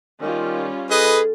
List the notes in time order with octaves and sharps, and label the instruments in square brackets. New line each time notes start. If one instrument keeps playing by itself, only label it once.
[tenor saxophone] D#3 [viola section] G3 C#4 F4
[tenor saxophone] G#4 [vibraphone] A4 [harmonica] B4 D#5